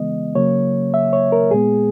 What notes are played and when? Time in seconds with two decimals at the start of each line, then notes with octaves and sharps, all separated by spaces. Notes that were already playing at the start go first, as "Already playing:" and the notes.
Already playing: C#3 E3 G#3 B3 D#5
0.35 C#3 F#3 A#3 C#5
0.94 E5
1.13 C#5
1.32 A#4
1.51 A#2 G#3 B3 G#4